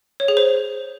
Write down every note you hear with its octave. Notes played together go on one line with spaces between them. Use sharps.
C#5
G#4
C5